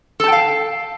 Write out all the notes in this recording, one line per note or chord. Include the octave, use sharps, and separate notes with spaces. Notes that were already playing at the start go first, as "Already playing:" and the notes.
A4 F5 G5 A5